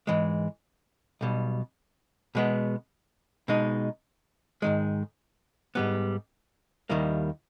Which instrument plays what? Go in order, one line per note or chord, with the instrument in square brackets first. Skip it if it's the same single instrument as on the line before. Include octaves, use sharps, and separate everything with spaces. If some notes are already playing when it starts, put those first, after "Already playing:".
[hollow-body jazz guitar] G#2 E3 G#3
B1 B2 G3
B2 G#3 B3
B2 G#3 D#4
G#2 D#3 G#3
G#2 G3 B3
D#2 D#3 G3 A#3 E4